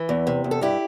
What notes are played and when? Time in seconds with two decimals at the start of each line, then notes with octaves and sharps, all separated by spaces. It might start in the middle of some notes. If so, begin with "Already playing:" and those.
Already playing: E3
0.09 E2
0.27 C3
0.44 E2
0.51 A4
0.61 G2 E4 G4